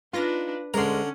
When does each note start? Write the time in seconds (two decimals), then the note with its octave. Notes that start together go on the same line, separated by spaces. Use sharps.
0.13 D4 D#4 F4 B4 A#6
0.74 D2 D3 G#3 C#4 A#4 A#5 C6